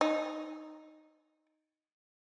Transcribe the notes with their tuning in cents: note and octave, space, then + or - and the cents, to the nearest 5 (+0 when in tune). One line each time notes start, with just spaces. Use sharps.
D#4 -5